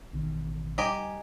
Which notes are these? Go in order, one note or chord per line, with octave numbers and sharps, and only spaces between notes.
A1 B2 D#3
G3 D#4 G4 G#5